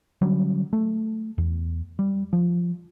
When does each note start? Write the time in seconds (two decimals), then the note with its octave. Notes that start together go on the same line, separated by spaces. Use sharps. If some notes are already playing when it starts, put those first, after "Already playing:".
0.22 D3 F#3 G3 C#4
0.73 A3
1.38 E2
1.99 G3
2.33 F3